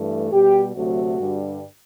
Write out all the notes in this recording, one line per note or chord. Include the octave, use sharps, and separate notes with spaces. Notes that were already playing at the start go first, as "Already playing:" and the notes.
Already playing: G2 E3 A3
B2 G3 G4
D2 C3 F#3 A3 F#4
G2 D3 G3